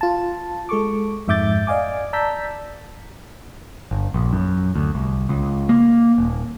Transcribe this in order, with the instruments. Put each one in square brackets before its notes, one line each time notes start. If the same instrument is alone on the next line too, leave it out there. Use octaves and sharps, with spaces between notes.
[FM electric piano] F4 A5
G#3 A4 C#6 D6
F2 G#2 E5 D6 G6 A6
D5 D#5 F5 G#5 D6
D5 A5 A#5 E6 G6 B6
[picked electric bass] G1
A#1
F#2
D2
C2
C#2
A#3
D#1